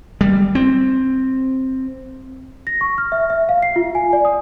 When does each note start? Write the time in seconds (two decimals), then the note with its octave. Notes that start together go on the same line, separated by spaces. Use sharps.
0.21 G3
0.55 C4
2.67 A#6
2.81 C#6
2.98 F6
3.12 E5
3.30 E5
3.49 F5
3.62 C7
3.76 F4
3.95 G#5
4.13 D5
4.25 D#6